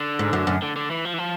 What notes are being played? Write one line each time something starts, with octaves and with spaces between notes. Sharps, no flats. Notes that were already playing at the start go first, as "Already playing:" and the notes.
Already playing: D3
G#2
F#2
F#2
D3
D3
E3
F3
E3
F3